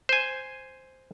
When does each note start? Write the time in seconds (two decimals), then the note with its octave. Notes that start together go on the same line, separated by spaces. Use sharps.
0.09 C5 G#5